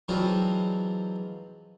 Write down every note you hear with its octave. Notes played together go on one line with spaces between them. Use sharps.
E3 F#3 G#3 C4 D4 F4